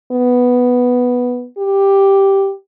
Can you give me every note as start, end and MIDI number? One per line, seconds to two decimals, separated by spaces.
0.12 1.46 59
1.58 2.54 67